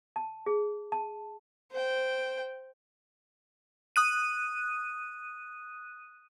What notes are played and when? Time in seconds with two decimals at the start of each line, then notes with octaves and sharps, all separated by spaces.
0.16 A5
0.46 G#4
0.92 A5
1.72 C5 G5
3.96 D#6 F#6 D#7